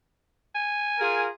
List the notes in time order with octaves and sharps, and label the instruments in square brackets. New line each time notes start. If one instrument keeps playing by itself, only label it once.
[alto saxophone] G#5
[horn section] F4 G#4 A#4